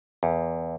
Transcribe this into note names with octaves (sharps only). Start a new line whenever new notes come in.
E2